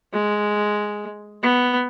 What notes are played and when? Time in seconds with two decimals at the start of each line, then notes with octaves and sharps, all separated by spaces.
0.13 G#3
1.43 B3